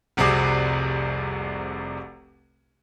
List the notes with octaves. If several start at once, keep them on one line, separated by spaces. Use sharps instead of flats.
F1 C2 C3 F#4 G#4 D6